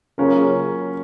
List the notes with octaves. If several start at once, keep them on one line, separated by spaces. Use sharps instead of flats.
C#3 F#3 A#3 C#4 F4 A#4